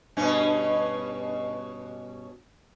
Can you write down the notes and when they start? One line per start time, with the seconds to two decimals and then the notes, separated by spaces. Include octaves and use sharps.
0.17 G2 B2 C#4